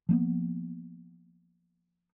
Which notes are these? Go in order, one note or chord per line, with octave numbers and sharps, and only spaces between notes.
F3 A#3 B3